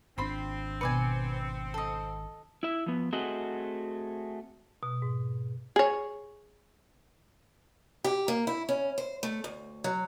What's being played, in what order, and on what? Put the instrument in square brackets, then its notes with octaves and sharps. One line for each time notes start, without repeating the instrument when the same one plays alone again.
[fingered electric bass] G#1 D4 [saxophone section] C4 [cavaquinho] F4 B5 C6
[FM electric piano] B2 C#7 [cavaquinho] B4 D5 G#5
[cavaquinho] A4 D#5
[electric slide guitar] E4 E5
F3 B3
A3 C4 F#4 G#4 D#5 F#5
[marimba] B2
G#2
[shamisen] G#4 C#5
[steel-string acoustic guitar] G4
A#3
E4
C#4
C5
A3
D2
F#3